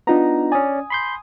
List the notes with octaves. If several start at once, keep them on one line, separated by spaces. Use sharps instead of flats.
B3 D4 D#4 F4 A#5
C#4 D5 G#5 D#6
B5 C6 G6